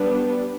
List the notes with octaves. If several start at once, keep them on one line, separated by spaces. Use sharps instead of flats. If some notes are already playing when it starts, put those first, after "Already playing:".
Already playing: G3 B3 D4